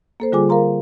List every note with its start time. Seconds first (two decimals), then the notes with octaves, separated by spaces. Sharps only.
0.20 A#3 A4 C5
0.32 D3 G3 F4 G#4 G#5 D6
0.49 A#4 F5 A#5 C6